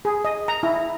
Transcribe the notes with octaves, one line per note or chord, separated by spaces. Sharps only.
G#4
D#5
A#5
E4